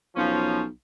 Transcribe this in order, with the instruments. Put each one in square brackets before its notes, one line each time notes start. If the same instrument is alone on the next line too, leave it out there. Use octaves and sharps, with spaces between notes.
[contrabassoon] B1 [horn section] F3 C#4